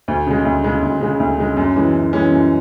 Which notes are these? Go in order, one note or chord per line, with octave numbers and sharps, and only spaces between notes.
D2
C#3 G#3
D2
C#3 G#3
D2
C#3 G#3
D2
C#3 G#3
F#2
E3 G#3 C#4
F#2
E3 G#3 C#4
F#2